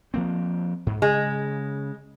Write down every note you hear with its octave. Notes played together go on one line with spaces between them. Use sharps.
F3 A#3 C4
G#2
C#3 G#3